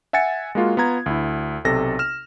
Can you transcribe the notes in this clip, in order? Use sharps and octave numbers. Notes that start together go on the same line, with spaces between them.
E5 F#5 G#5 A6 C#7
G#3 A#3 F4 F#4
B3 F4 A#5 G#6
D2 E4
B1 C3 A4 A#6
F6 E7